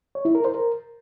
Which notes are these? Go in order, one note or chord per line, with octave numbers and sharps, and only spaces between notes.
C#5
E4
A#4
C5
A#4